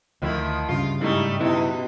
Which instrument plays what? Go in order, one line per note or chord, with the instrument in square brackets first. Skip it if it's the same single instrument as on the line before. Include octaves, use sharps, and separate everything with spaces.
[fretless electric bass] D2 [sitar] D#3 F3 E4
[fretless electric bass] G2 C#3 [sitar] F4
[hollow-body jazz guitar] G#2 E4 [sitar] G3 A3 D#4
[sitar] B2 D#4 [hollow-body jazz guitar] E4